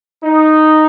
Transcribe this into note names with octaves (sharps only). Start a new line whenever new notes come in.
D#4